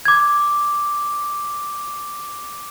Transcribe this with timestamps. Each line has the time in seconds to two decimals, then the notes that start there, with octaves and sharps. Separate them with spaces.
0.05 D6 G#6